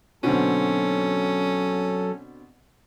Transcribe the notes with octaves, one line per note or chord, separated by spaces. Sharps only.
B2 D3 F#3 C4 C#4 A4